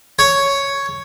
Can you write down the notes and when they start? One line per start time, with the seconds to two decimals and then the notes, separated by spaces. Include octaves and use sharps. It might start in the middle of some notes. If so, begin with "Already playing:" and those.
0.19 C#5